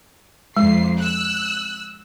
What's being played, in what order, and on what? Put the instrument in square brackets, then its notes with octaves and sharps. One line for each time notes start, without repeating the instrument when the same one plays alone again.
[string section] F2 C7 [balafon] G#3
[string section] E6 F#6